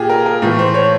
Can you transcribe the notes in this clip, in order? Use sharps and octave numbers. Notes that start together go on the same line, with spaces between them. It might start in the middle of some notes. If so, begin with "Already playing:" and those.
Already playing: A#2 G4 G#4
A#4
A#4
A2 E3
C5
C#5